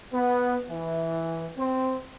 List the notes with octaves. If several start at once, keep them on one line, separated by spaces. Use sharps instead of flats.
B3
E3
C4